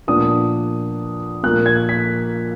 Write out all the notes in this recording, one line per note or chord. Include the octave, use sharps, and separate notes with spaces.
A#2 F3 B3 D4 D#6
A#2 F3 A#3 F#6
G#6
B6